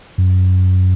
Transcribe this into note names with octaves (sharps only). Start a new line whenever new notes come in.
F#2